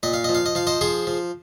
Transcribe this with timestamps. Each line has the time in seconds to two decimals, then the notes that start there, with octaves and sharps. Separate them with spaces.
0.03 A#2 D#5
0.13 F5
0.24 F3 D#5
0.35 F5
0.46 D#5
0.55 F3 F5
0.67 C5 D#5
0.81 F3 G#4 C5
1.07 F3